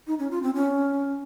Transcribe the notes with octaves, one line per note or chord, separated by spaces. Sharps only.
D#4
C#4
F4
C4
C#4